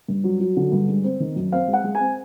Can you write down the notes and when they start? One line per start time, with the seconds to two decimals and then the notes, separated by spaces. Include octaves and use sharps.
0.08 G2
0.24 F#3
0.40 F#3
0.57 D3
0.72 G2
0.88 G#3
1.04 C4
1.20 D#3
1.36 F#2
1.52 C4 F5
1.68 G#3
1.73 F#5
1.84 G#3
1.95 G#5
2.00 C4